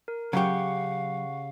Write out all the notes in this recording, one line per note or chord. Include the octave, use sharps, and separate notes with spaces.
A#4
C#3 F#3 G4 F5 F#5 C#6